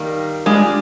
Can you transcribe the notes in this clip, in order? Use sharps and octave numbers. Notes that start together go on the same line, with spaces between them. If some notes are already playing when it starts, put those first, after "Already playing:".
Already playing: D#3 G3 A#3
G3 G#3 D4 F4